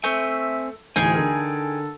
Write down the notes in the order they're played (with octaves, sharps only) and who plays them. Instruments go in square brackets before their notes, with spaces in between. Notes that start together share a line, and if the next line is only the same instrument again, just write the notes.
[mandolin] A3 [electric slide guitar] C4 C5 G#5 [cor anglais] E5
[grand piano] D1 D2 E3 [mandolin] D#4 G#4 [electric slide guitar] G5 G#5
[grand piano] D3 A#4 [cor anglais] A4